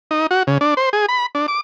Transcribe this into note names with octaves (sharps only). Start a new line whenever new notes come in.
D#4
F#4
C#3
D4
C5
G#4
B5
D4
D6